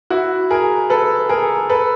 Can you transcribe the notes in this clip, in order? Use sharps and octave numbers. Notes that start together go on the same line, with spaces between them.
E4 F#4
G#4 A#4
A4 B4
G#4 A#4
A4 B4